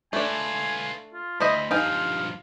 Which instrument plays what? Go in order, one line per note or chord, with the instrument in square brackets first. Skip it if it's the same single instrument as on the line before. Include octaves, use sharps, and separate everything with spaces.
[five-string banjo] A3 D4 [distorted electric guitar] F4 B4 [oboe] G#5
[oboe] F4
[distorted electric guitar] D2 [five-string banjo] E4 C5 D#5 [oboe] B5
[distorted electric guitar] G2 F3 [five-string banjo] D#4 G5 G#5 [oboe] F5